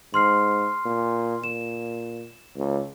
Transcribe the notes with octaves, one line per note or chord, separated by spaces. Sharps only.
G#2 C6 F6 C7
A#2
A#2 E7
C#2